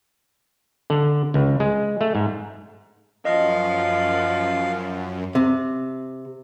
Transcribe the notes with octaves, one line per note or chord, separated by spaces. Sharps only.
D3
C#2
G#3
A3
G#2
F#2 F3 D#5 F5
C3